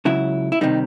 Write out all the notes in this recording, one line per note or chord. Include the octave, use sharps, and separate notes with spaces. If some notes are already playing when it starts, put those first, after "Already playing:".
C#2 C#3 F#3 E4
E4
C3 D#3 G3 D#4